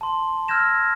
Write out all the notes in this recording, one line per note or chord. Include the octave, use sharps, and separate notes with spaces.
A5 C6
E6 F6 G6 G#6 A#6 E7